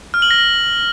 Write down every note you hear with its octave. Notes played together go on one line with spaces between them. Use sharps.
F6
F#7
A#6